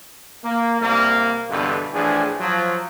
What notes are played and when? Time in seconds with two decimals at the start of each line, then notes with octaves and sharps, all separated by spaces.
0.44 A#3
0.81 C2 A#3
1.50 E2 G2 B2 D3
1.93 A2 E3 F3 D4 G#4
2.41 F3 F#3